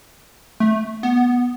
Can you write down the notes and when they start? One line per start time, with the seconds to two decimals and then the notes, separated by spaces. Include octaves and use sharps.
0.60 A3
1.03 B3